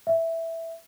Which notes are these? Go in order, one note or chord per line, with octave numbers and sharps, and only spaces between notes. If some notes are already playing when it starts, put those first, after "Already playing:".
E5